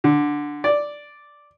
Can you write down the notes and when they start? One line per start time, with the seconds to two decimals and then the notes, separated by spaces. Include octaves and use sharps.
0.04 D3
0.64 D5